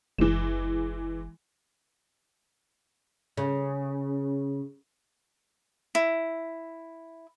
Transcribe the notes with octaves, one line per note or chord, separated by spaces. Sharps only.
F#1 E3 G#3 E7
C#3
E4